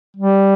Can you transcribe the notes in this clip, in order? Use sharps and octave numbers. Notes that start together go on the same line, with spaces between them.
G3